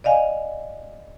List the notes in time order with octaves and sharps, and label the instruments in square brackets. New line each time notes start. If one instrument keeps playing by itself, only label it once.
[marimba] D5 D#5 F5 G#5